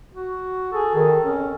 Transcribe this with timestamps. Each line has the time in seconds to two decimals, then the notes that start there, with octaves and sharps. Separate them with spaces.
0.13 F#4
0.72 G#4 A4
0.95 D#3
1.25 F2 C#4